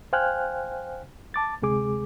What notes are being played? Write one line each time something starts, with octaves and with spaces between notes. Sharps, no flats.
C5 F5 G5 G#5 F6 F#6
A5 D6 A6
D2 C3 G#3 G#4 D6